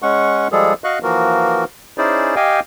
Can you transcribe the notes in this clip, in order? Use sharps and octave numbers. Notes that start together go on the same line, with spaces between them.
G#3 C#4 F#5 C#6
F3 G3 G#3 G#4 A4
F#4 D#5 F5 C#6 F#6
E3 F3 A#3 F#4 A#4
C#4 D#4 E4 G#4 C5 D5
G4 D#5 F5 G5 G#5